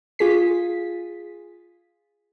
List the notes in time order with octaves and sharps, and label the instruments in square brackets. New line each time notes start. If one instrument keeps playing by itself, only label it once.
[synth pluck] F4 G#4 B6